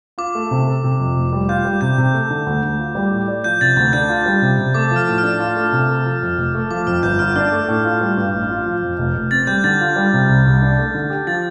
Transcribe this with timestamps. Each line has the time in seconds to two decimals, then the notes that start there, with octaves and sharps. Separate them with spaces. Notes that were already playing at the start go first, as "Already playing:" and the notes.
0.18 F4 D6
0.35 A3
0.51 C3
0.67 A4
0.84 C3
1.00 F2
1.16 F1
1.33 G3
1.49 F4 G6
1.65 G3
1.81 C3 G6
1.98 C3
2.14 A3
2.30 D3
2.47 D2
2.62 D2
2.79 F4
2.95 G3
3.11 A2
3.28 D5
3.44 F3 G6
3.61 C3 A6
3.77 D2 A6
3.93 D4 G6
4.09 F4
4.26 G3
4.42 C3
4.58 C3
4.74 A3 D6
4.91 F3
4.96 F6
5.08 A2
5.18 F6
5.23 D4
5.40 F4
5.56 A3
5.72 C3
5.89 A4
6.06 F3
6.22 F2
6.38 F1
6.55 A3
6.70 F3 D6
6.87 F2 F6
7.03 G1 G6
7.19 G1 F6
7.36 D4 F6
7.52 A3
7.68 A2
7.85 F4
8.01 G3
8.17 G2
8.34 A1
8.50 F4
8.66 F3
8.82 F2
8.98 F1
9.15 F1
9.31 C4 A6
9.47 G3 G6
9.64 D3 A6
9.81 F4
9.96 G3
10.13 C3
10.29 C2
10.46 C2
10.62 D4
10.79 A3
10.95 D3
11.10 G4
11.27 F3 A6